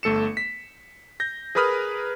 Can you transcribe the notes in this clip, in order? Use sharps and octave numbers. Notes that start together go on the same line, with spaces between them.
G1 A3 A4 C#7 E7
B6
G6 A#6
G#4 A#4 B4 B5 D#6 F6